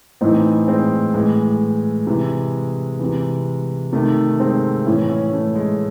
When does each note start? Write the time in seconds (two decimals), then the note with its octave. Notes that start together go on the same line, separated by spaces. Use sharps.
0.21 A2 E3 C4 D#4
0.67 G#3 C4
1.14 A2 E3 G#3
2.07 C3 E3
3.00 C3 E3
3.93 C3 D#3 A3
4.40 G#3 C4
4.86 A2 E3 C#4 E4
5.09 C#4 E4
5.32 A3 C#4
5.55 G#3